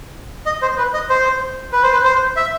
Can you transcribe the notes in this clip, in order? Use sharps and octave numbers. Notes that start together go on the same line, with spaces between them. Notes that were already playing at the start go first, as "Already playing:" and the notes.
D#5
C5
B4
D#5
C5
B4
C5
B4
C5
E5